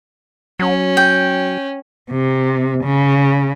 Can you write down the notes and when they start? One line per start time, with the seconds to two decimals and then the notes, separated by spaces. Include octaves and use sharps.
0.59 F#3 C#4
0.97 G5
2.11 C3
2.83 C#3